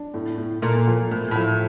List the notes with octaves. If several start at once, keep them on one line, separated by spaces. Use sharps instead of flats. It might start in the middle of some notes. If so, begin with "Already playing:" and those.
Already playing: D4
A2
A2
A#2 A3
F3
A2 A3
A2 F3